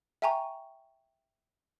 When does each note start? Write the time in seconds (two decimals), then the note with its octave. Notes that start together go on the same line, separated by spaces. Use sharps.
0.22 E5 G5 G#5 A#5 C#6